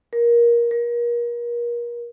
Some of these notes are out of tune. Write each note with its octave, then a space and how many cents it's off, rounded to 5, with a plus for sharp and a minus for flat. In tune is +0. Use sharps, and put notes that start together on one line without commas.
A#4 +20
A#4 +35